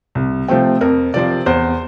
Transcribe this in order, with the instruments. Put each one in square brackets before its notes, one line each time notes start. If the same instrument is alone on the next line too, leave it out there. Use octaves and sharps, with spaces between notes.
[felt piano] C2
C3 F3 A3 C4 G5
F2 A#4
C3 F3 C4 D5
E2 C5